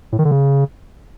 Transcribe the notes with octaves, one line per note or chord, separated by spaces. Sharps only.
A2
D#3
D3
C#3